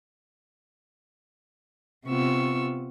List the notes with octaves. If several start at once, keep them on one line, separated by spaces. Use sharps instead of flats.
C3 B3 F4 C#6 E6